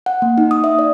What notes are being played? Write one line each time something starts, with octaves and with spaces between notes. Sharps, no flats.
F#5
A#3
D#4
D#6
E5
D5